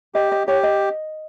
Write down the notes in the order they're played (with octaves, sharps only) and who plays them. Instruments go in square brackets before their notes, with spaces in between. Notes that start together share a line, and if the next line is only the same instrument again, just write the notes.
[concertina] G4 [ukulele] D#5
[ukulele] D#5
[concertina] G4 [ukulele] C#5
[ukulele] D#5